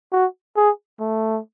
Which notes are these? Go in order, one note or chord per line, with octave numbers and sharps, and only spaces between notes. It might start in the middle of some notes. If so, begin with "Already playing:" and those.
F#4
G#4
A3